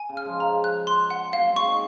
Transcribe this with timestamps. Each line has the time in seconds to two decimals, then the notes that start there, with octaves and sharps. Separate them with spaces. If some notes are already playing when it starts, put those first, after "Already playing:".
Already playing: G#5
0.09 C#3
0.17 F6
0.25 F3 G#3
0.40 A#5
0.64 F#6
0.87 C6
1.10 F#5
1.33 F#3 A#3 F5
1.49 G#3 C4
1.56 C#6
1.64 C4 D#4